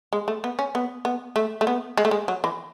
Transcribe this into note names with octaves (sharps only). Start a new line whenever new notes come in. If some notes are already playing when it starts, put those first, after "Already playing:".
G#3
A3
B3
C#4
B3
B3
A3
A3
B3
G#3
A3
G#3
F#3
E3